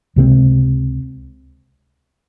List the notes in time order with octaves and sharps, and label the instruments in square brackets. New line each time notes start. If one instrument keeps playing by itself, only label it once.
[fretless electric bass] C#2 C3 F#3 C4